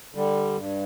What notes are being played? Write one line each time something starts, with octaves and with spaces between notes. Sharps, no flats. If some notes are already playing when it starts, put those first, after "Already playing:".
D3 G3
G2